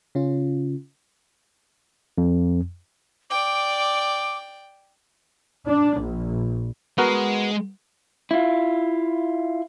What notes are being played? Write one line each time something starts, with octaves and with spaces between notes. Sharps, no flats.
C#3 C#4 F4
F2
D5 G5 D6
D4
A#1
G#3 B3 F#4 A#4
E4 F4